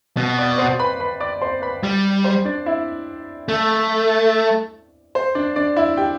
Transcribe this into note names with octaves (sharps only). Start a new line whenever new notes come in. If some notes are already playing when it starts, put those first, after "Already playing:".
B2
D5 D6
C5 C6
B4 B5
B4 B5
D5 D6
C5 C6
B4 B5
G3
C5
D4 D5
E4 E5
A3
C5
D4 D5
D4 D5
E4 E5
G4 G5